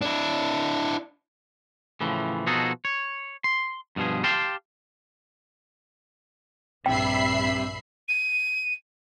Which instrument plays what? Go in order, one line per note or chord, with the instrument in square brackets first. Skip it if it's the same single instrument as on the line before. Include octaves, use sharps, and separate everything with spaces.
[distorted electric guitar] D4 E4
[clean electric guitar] A2 C#3 E3 F3
B2 F3 D#4 F#4 G#4 A4
C#5
C6
G2 B2 D#3 F3 G#4
G4 F5 G5 A5 C6
[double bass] A#1 G2 [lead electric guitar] C3 [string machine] E5 B5 C7 [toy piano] G5
[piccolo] D#7